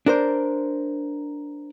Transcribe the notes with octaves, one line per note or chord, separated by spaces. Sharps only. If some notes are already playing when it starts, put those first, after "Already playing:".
D4 A#4 C5